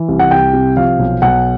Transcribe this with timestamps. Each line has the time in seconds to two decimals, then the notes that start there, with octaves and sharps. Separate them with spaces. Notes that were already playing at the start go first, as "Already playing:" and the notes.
Already playing: E3
0.08 C2
0.19 F#5
0.31 C2 G5
0.53 C3
0.77 F3 F5
0.99 B1
1.22 B1 F#5